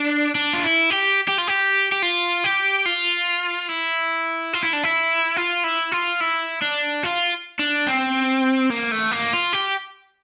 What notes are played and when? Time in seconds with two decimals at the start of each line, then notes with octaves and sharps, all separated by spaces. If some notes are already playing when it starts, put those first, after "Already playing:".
Already playing: D4
0.35 D4
0.53 F4
0.64 E4
0.91 G4
1.29 G4
1.38 F4
1.48 G4
1.92 G4
2.02 F4
2.44 G4
2.86 F4
3.69 E4
4.53 F4
4.63 E4
4.73 D4
4.83 E4
5.36 F4
5.64 E4
5.92 F4
6.20 E4
6.62 D4
7.04 F4
7.59 D4
7.87 C4
8.70 A#3
8.92 A3
9.11 A#3
9.33 F4
9.53 G4